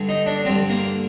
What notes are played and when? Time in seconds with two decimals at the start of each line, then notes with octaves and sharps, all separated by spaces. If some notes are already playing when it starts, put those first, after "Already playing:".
Already playing: G2 D3
0.09 D#4
0.26 D4
0.45 G2 D3 C4
0.70 A#3